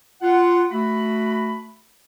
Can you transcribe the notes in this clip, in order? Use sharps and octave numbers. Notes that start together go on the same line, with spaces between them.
F4 F#5
A3 F#4 B5